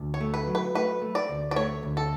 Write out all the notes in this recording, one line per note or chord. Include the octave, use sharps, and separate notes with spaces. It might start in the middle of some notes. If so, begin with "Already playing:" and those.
Already playing: D2
C#5
A3
B4
F#3
B4
A3 B4
A3
D5
D2
D5
A3 C#5
D2
A4